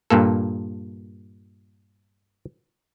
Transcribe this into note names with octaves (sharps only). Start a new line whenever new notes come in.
G2 A#2 A#3 A4